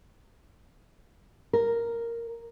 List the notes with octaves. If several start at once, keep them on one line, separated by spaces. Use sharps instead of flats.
A#4